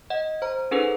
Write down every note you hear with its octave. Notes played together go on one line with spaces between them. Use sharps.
D#5 F#5
C5 A#5
C#4 D#4 G#4 A4 B4